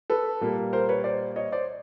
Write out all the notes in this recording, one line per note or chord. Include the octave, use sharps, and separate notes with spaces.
A4 B4
A#2 G3 A#3
A#4 C5
B4 C#5
C5 D5
C#5 D#5
C5 D5